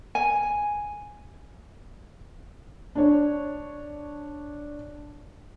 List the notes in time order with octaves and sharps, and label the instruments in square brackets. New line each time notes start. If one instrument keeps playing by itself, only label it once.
[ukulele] G#5
[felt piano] D4 C#5